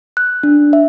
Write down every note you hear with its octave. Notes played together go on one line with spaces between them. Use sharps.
F#6
D4
E5